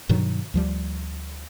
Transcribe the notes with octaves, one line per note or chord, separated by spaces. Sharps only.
G2 B2 D#3 F#3
D2 F3 G3